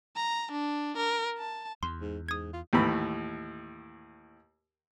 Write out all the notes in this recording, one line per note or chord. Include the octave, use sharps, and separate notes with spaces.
A#5
D4
A#4
A5
E2 C6
G#2
G#2 D#6 G#6
F4
D#2 A2 E3 B5